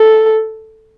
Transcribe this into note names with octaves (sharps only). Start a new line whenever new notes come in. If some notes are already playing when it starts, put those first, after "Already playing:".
Already playing: A4